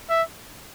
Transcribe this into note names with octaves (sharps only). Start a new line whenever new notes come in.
E5